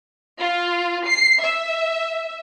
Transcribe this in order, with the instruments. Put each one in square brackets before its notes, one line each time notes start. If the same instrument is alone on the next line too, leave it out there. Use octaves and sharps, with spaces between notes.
[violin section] F4
C7
E5